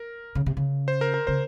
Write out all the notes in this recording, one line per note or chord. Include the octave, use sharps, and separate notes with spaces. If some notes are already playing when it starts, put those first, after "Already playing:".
Already playing: A#4
C#3
C3
C#3
C5
A#4
A#4
C#3 C5